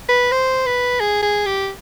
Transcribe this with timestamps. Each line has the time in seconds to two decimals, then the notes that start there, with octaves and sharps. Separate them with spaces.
0.09 B4
0.32 C5
0.66 B4
1.00 G#4
1.23 G#4
1.46 G4